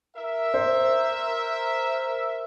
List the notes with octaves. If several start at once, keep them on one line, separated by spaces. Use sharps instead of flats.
A#4 E5
C5